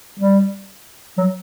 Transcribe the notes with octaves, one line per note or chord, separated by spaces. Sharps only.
G3
F#3